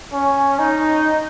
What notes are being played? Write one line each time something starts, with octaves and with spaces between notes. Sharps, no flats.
C#4
D#4